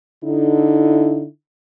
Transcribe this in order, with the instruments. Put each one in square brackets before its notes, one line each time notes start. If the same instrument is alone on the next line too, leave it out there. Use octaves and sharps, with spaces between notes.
[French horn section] D3 D#4 E4